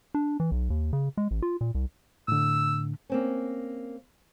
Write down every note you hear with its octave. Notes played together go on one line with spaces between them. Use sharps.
D4
E3
B1
D#2
C#3
G#3
A1
F4
A#2
C2
A2 D3 E6
A#3 C4 C#4